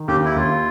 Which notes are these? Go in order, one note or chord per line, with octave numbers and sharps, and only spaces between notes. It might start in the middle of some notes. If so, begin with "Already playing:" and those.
Already playing: D#3
D#2 G4
E4
D#2 F4